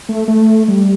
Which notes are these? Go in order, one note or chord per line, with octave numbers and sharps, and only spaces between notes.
A3
A3
G3